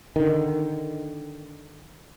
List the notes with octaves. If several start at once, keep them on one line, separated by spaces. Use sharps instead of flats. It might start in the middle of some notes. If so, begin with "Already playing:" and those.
D3 D#3